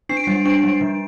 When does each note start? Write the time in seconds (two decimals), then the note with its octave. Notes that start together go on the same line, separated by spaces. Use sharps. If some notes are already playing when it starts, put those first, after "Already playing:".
0.09 D4 C7
0.17 D7
0.24 C7
0.27 G3
0.45 D4 D7
0.64 G3
0.81 F3